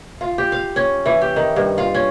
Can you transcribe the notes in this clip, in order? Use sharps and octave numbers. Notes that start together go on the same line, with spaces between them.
F4
G4
F5
C#4
E3
G4
D#3
G2
F4
C#4